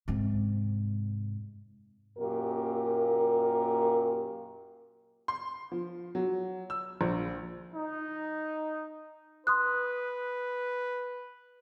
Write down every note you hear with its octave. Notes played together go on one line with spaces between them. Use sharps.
G#2 C3
F#2 A#2 A#3 G4 A#4
C6
F3
F#3
E6
A#1
D#4
B4 C6 D#6 F#6